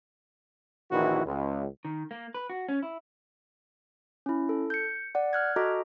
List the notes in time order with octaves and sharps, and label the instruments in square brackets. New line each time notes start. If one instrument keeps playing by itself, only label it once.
[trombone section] A#1 D#3 E3 E4 F#4
C#2
[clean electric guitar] D#3
A#3
B4
F#4
C#4
E4
[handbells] C#4 E4
A4
G6 C#7
D5 F#5
F6 F#6 G#6
F#4 A4 D#5 A#5 D6